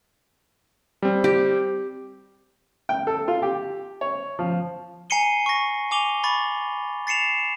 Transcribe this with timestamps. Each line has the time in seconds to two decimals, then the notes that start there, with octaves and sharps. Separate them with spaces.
1.02 G3 C4
1.24 G4
2.89 G5
3.07 A4
3.28 F4
3.42 G4
4.01 C#5
4.39 F3
5.10 G#5 A#5 C7 C#7 D#7 G7
5.46 C#6 A#6
5.91 G#5 D6 F7 G7
6.24 B5 C#6 A6
7.07 A6 C7 C#7 E7 F7